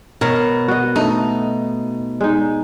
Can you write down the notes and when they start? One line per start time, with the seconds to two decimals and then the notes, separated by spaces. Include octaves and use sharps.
0.21 B2 A#4 C#5
0.68 F#4 D#5
0.96 A3 D#4
2.21 G#3 D#4